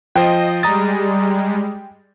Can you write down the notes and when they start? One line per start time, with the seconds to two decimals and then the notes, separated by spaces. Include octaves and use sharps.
0.15 F3 C5 D#5 G5
0.63 G3 G#3 A#5 D#6 A6